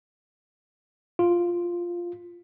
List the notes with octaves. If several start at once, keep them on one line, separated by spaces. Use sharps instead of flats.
F4